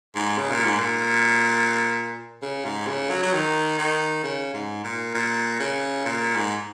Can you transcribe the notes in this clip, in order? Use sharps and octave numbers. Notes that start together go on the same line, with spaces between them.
G#2
C#3
A#2
G#2
A#2
C#3
G#2
C#3
F#3
F#3
D#3
D#3
C#3
G#2
A#2
A#2
C#3
A#2
G#2